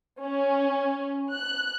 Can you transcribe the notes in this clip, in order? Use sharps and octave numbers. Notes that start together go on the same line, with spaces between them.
C#4
F#6